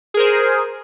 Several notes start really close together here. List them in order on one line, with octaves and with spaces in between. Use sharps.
G#4 A#4 C5